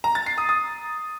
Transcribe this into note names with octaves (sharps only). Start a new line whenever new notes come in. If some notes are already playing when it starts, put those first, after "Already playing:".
A#5
A6
C7
D#6
D#6